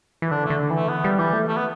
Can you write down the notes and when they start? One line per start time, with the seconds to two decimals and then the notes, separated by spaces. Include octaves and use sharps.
0.22 E3
0.31 D3 D4
0.46 D3 A3
0.70 E3
0.76 A3
0.89 B3
1.04 G3
1.18 E3 G3
1.33 A3
1.48 A3
1.57 B3